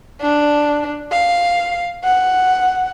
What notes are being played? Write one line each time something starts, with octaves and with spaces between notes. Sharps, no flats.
D4
F5
F#5